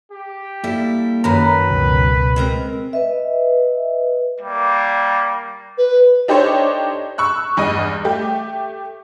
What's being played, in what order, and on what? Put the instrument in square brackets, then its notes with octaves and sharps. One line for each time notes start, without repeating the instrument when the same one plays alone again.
[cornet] G4
[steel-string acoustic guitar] G3 E4 [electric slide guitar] A#3 A4 E5
[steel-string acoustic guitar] F#2 D#3 G#5 [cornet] B4 [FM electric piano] A#5 B5
[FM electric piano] C#2 [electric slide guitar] B2
[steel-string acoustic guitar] G#3 C4 A#4
[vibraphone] B4 D#5 E5
[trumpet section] G3 A#3
[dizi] B4
[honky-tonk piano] D4 D#4 G4 A4 C5 C#5
C#6 E6 F#6
E2 G2 D#5 D#7
A3 G4